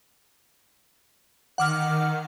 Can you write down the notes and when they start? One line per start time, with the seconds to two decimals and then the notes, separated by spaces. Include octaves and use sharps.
1.58 D#3 F#5 D6 F6